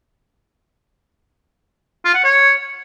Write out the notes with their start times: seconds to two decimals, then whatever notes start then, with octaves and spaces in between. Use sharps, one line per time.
2.05 F4
2.14 F#5
2.24 C#5